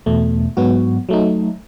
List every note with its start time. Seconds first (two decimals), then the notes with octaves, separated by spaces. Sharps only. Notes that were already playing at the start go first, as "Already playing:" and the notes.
0.06 E2 B2 A3
0.57 G#2 F#3 B3 F#4
1.09 F#3 A3 D#4